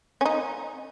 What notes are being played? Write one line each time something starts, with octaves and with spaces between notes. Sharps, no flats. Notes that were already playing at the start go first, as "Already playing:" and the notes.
C#4
D#4